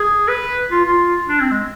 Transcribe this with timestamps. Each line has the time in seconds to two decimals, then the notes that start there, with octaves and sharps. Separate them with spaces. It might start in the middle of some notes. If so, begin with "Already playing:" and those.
Already playing: G#4
0.28 B4
0.72 F4
0.85 F4
1.28 D4
1.41 C4
1.51 G#3